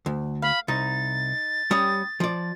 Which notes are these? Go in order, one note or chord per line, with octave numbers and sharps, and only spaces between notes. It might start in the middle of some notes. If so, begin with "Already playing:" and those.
D2
F5 B5
C2 D#4 A6
G3 C#4 G4 D#6
F3 D5